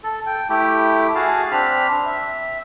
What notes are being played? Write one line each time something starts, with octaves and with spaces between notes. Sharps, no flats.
A4
G5
A3 E4 G4 G5
F#4 G#4 F5 A5
C4 D4 B5 F6
E5